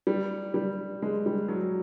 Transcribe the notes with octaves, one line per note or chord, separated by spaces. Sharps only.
G3
G3
G#3
G3
F#3